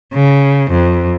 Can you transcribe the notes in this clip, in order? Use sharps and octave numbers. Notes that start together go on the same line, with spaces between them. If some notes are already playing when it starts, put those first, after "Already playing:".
C#3
F2